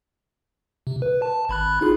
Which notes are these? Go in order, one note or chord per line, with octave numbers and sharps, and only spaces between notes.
C3
B4
A5
G#1 B5 F#6
D#4 F4 G#4